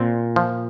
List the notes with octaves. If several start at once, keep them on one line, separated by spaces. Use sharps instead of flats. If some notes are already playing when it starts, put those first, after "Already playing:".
Already playing: A#2 C4
F3